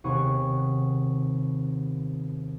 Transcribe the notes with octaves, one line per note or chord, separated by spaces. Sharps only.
D#2 C3 B3 G#4 C#6